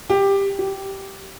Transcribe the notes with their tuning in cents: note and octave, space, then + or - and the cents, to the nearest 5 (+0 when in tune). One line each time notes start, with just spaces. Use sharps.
G4 +10
G4 -10